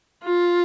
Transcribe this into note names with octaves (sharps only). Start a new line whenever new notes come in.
F4